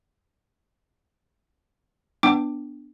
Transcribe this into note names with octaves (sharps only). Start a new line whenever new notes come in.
B3 D4 G5 D6